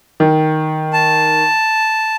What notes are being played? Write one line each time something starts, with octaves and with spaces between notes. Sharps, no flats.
D#3
A5